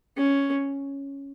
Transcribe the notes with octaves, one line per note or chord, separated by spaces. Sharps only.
C#4